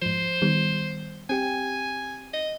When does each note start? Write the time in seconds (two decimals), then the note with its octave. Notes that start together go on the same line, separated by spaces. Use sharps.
0.02 G#2 F3 C5
0.42 D#3 G3 B3
1.29 C4 G4 G5 G#5
2.34 D#5